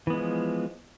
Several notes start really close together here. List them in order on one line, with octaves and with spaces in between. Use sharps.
E3 B3 G#3 F3